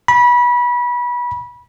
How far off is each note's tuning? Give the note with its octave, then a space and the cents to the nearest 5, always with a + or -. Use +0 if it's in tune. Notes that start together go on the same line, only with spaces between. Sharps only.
B5 -25